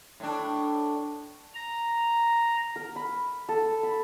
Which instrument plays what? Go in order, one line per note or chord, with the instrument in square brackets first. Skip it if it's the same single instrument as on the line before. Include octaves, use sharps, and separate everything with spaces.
[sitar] A2 D4
[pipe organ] A#5
[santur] A#4
B5
A4
B5